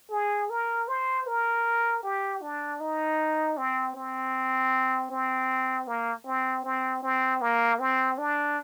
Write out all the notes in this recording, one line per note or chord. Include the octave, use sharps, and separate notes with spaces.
G#4
A#4
C5
A#4
G4
D4
D#4
C4
C4
C4
A#3
C4
C4
C4
A#3
C4
D4